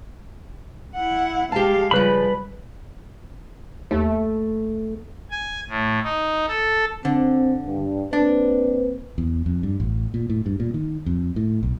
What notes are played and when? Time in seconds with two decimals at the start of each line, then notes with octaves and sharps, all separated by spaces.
0.95 E4 F#5
1.52 G#3 G4 F5 A5
1.91 C#3 F3 G3 B4 B5
3.91 D#2 A3
5.31 G#5
5.69 A2
6.04 D#4
6.48 A4
7.05 D3 C4
7.67 G2
8.13 A#3 C4 D4 B4
9.18 E2
9.46 F2
9.63 G2
9.80 A1
10.14 A#2
10.30 A2
10.46 G2
10.60 A#2
10.74 D#3
11.06 F2
11.36 A2
11.63 B1